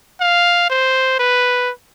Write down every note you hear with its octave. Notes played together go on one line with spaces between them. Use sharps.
F5
C5
B4